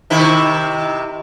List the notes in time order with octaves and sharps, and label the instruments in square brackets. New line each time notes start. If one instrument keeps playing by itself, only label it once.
[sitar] C3 D#3 E4